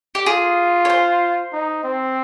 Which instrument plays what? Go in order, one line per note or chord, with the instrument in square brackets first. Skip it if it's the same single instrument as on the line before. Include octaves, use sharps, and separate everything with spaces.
[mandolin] G4
[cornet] F4 [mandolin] G#4
[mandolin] C#5
C5
[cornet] D#4
C4